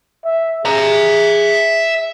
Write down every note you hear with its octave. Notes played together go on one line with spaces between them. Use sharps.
E5
G#4 E5 A#5